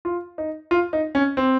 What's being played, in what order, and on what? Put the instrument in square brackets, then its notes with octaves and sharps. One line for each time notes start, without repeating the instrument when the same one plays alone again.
[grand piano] F4
D#4
F4
D#4
C#4
C4